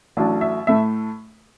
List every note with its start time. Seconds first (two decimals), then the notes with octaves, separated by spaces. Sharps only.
0.17 A1 A2 F#3 D4 A5
0.41 E5
0.67 A2 A3 E5